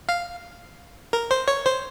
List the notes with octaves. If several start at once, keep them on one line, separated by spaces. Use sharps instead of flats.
F5
A#4
C5
C#5
C5